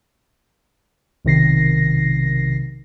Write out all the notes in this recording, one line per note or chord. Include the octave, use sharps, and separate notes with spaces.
B1 C3 D#3 A#6 C7